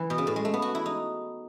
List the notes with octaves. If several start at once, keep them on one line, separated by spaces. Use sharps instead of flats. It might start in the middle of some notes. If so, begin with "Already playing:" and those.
Already playing: E3
B2
C#3
A2
G#3
A3
B3
F#4
E4
D#4